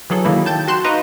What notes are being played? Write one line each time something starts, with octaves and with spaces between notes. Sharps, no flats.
E3 F#3 G#4 A4
D#3 F#3 A#3 E4
G5 A5 G6 A6
F#4 C6 F#6 E7
D#4 B4 D#5 F5 A#5 C#6